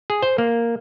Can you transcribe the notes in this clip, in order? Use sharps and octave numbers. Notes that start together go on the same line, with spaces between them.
G#4
C5
A#3